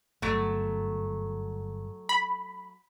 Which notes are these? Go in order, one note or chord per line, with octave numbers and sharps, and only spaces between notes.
G1 F#3 A3
B5